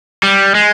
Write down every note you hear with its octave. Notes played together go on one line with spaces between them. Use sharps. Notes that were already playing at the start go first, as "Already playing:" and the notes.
G3
G#3